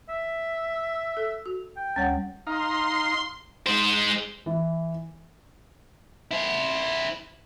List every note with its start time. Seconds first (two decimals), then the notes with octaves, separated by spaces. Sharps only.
0.09 E5
1.17 A4
1.46 F#4
1.77 G5
1.96 D2 G3 C#4 C#5 F#5
2.47 D#4 F5 A#5 C6
3.67 G#3 C5
4.46 E3
6.31 E4 C5